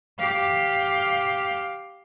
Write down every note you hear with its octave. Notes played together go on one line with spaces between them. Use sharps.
G4 F5